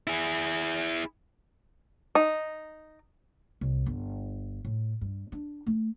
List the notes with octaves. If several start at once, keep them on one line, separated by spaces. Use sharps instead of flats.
E4 G#4
D#4
C2
G1
A2
G2
D4
A3